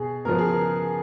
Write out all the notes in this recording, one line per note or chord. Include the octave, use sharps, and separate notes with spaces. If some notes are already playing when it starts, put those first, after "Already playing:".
Already playing: B2 G#4
C#3 F3 B3 A#4
G#4
A#4